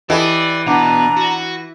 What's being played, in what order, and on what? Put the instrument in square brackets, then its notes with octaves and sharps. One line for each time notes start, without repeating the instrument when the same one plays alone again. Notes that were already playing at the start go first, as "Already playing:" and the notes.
[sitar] E3 [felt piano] G4 A4 D#5 [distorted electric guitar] D5
[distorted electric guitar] B2 [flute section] D4 D5 A#5 [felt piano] F#5 D6
[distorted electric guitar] F#4